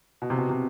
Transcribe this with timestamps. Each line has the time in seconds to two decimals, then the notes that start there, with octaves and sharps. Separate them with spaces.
0.22 B2
0.30 C3
0.38 B2
0.50 C3